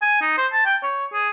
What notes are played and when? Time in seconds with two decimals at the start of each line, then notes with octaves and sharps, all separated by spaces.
0.02 G#5
0.21 D#4
0.38 C5
0.52 A5
0.65 G5
0.83 C#5
1.13 G#4